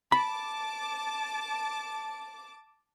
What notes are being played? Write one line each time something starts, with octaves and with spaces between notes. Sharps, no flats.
A5 B5 D6